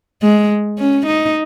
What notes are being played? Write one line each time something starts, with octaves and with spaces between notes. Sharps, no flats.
G#3
C#4
D#4